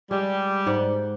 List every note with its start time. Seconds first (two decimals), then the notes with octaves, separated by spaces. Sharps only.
0.11 G3 G#3
0.66 G#2 F#5